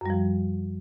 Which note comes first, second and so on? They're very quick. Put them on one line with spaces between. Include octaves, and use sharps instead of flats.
F#2 G3 F3